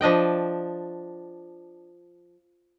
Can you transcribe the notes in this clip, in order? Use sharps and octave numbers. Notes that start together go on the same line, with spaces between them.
F3 D4 D#5 G5